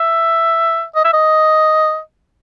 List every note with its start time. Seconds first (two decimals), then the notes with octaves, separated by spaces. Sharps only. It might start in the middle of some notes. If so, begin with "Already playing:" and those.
Already playing: E5
0.95 D#5
1.05 E5
1.13 D#5